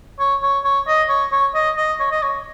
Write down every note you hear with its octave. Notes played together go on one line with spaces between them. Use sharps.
C#5
C#5
C#5
D#5
C#5
C#5
D#5
D#5
C#5
D#5
C#5